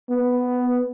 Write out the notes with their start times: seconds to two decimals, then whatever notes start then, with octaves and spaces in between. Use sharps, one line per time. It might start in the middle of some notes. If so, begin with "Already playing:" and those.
0.10 B3